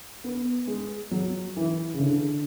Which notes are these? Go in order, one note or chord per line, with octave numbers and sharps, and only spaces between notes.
B3
G#3
F#3
E3
C#3
D3